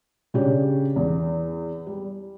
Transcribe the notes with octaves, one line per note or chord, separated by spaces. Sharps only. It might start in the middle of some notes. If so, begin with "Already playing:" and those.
C#3 D4 G4 C#5
E2
G3